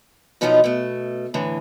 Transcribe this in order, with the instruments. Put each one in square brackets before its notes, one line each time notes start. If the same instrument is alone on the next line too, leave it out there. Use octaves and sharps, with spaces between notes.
[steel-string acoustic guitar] B2 F3 F#3 B3 D#4 F4
B2 A3
A2 D3 E3